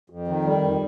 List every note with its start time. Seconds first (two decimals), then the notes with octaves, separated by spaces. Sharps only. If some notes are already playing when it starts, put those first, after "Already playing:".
0.10 F2
0.28 D#3
0.44 G3
0.61 F2